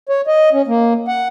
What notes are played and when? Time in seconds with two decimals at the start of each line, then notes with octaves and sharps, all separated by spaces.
0.09 C#5
0.27 D#5
0.53 C#4
0.68 A#3
1.08 F#5